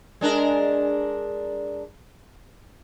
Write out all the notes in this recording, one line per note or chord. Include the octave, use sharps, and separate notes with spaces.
G#3 D4 A#4